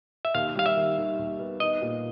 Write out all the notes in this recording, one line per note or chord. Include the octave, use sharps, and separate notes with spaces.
E5
D#2 F5
G3 F5
E5
D#3
D#3
D#2
B3
D#4 D#5
A#2